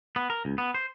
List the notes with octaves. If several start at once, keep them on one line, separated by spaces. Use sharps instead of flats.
B3
A#4
C#2
B3
C5